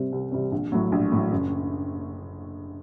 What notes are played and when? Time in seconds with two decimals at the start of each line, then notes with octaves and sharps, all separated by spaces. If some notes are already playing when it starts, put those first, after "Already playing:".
Already playing: C3 G3 C4
0.12 C2
0.32 C3 G3 C4
0.52 A#1
0.72 A2 F#3
0.92 A#1
1.12 A2 F#3
1.32 F#1